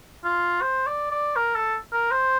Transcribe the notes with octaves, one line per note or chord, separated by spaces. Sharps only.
F4
C5
D5
D5
A#4
A4
A#4
C5